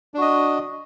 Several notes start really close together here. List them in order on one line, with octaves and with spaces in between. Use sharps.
D4 F#4 D#5